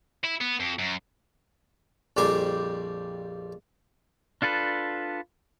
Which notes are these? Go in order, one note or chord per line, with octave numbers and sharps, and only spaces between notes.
E4
B3
F2
F#2
A#1 F2 G3 G4 C5 G#5
D4 F4 A4 B4